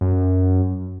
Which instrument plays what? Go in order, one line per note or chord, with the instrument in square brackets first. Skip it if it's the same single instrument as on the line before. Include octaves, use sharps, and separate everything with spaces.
[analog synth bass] F#2